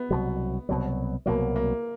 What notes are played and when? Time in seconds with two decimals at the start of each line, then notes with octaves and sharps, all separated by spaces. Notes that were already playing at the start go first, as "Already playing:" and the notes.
Already playing: B3
0.11 C2 B2 F#3
0.69 C2 B2 F#3
1.26 C2 B2 F#3 A#3
1.56 A#3